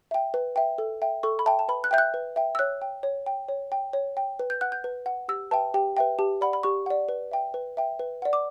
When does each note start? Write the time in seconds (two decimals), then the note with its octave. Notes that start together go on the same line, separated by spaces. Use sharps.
0.11 E5 G5
0.34 B4
0.56 E5 G5
0.78 A4
1.02 E5 G5
1.23 A4 C#6
1.39 B5
1.46 E5 G5 A5
1.59 A5
1.68 B4 B5
1.84 F#6
1.91 E5 G5 G6
1.98 F#6
2.14 B4
2.36 E5 G5
2.55 E6
2.59 C#5 F#6
2.82 G5
3.03 C#5
3.26 G5
3.49 C#5
3.72 G5
3.93 C#5
4.17 G5
4.39 B4
4.50 G6
4.61 F#5 F#6
4.72 G6
4.84 B4
5.06 F#5
5.28 G4 E6
5.51 B4 E5 G5 A5
5.74 G4 G5
5.97 B4 E5 G5
6.19 G4 A5
6.41 D5 F#5 B5
6.53 B5
6.63 G4 C#6
6.86 D5 F#5
7.09 B4
7.31 E5 G5
7.54 B4
7.77 E5 G5
7.99 B4
8.22 D5 F#5
8.33 D6